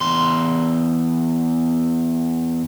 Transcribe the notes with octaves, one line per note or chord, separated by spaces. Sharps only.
E2 C6